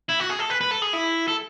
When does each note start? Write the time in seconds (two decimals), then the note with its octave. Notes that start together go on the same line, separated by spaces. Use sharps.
0.09 E4
0.20 F#4
0.30 G#4
0.39 A4
0.50 B4
0.61 B4
0.71 A4
0.82 G#4
0.93 E4
1.28 A4